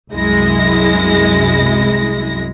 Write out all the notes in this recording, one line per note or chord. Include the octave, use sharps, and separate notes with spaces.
C2 F#2 G#3 E4 A#6